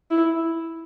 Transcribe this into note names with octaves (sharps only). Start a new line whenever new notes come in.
E4